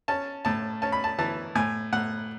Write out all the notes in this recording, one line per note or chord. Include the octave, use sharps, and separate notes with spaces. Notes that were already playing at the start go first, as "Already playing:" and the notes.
C#4 A5
A2 A5
C#4 A5
B5
A5
E3 A5
A2 G#5
A2 F#5